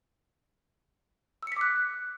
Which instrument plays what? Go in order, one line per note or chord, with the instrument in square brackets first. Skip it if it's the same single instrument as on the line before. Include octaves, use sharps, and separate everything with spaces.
[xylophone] E6
C#7
B6
D6
F#6